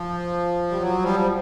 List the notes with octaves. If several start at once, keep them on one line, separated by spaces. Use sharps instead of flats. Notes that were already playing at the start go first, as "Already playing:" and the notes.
Already playing: F3
G3
F#3
F3 G3
F3